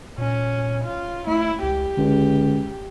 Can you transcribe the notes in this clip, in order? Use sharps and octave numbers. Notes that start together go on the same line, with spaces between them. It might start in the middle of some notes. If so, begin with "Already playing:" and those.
A#2 C#4
F4
A3 E4
C#2 G4
C#2 D3